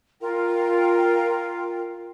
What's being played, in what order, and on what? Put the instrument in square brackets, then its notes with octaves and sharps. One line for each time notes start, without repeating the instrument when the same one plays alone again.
[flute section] F4 A#4 G5